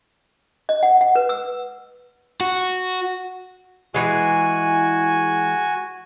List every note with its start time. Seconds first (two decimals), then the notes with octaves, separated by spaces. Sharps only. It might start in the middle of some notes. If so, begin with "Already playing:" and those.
0.69 D#5
0.83 F#5
1.01 F#5
1.15 B4
1.29 E6
2.41 F#4
3.94 E3 G#3 F#4 G#5